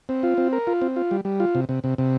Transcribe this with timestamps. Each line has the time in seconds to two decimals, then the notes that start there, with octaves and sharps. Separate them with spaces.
0.09 C4
0.23 F4
0.38 C4
0.53 A#4
0.67 F4
0.82 C4
0.96 F4
1.11 G3
1.25 G3
1.40 F4
1.55 C3
1.69 C3
1.84 C3
1.98 C3